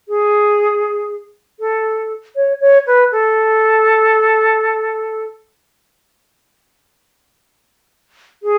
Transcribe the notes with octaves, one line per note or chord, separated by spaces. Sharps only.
G#4
A4
C#5
C#5
B4
A4
G#4